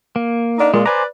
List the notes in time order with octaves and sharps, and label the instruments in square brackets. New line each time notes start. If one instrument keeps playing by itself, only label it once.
[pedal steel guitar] A#3
[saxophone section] A#3 D4 D#4
[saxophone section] A#2 [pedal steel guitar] G#3
[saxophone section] B4 D5 [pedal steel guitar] C5 G#5 A#5